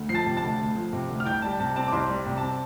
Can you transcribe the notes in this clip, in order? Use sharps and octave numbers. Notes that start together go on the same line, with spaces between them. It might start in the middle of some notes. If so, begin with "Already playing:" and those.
Already playing: D2
F3 C7
A5 A6
C3
A5 A6
D2
D2
F3
C3
D2
F6
C2 G5 G6
G3 A5
C3 A5
C4 A5
D6
C2 C5 C6
G3
C3
C4 A5